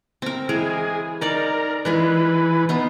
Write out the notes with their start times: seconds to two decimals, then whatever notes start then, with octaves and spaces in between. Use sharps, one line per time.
0.22 C4 A#4
0.49 E3 G#3 G#4 A#4
1.21 D#4 A#4 D5 F5
1.85 E3 G#3 F4 G#4 B4
2.69 B3 D#4 F4